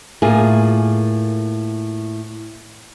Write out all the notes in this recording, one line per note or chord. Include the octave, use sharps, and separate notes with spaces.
A2 A#3 F4 G#4